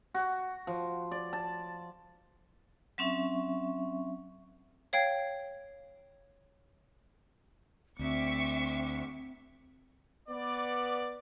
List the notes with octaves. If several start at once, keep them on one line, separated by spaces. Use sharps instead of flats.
F#4
F3
D5
A5
F#3 C4 C#4 E5 C#6
C#5 F5 G5 G#6
D2 C4 E5 C#6 D6
B3 D5